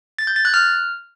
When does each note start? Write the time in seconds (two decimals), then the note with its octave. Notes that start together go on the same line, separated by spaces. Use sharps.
0.19 A6
0.27 G6
0.36 A6
0.45 F#6
0.54 F6